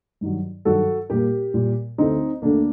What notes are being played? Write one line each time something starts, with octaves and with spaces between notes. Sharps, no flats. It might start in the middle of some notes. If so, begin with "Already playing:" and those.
G2 D#3 F#3
G2 D#3 F#3 F#4 A4
A#2 G3 A#3 G4 A#4
A#2 G3 A#3
D2 D3 A3 C4 D#4
D2 D3 A3 A#3 D4